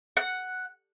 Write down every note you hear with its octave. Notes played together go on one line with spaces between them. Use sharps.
F#5